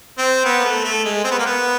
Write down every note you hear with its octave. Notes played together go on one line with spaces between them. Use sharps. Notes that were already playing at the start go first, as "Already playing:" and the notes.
C4
B3
A#3
A3
A3
G#3
C4
B3
A#3
B3